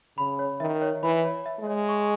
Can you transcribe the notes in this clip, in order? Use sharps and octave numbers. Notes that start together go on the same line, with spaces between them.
C#3 B5
C#5
D#3 E5
C#5
E3 B5
C#5
E5
G#3
C#5
C#6